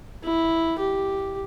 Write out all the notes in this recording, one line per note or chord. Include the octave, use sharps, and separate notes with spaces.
E4
G4